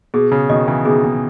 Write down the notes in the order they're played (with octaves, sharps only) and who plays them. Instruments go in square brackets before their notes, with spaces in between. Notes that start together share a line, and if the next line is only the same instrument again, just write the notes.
[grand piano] B2 [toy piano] G#4
[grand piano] C#3
[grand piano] B2 D#3 [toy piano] D#5
[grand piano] C#3 E3
[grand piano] B2 D#3 [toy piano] G#4
[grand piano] B2